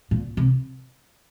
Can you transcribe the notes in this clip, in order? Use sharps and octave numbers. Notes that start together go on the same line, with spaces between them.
A#2
C3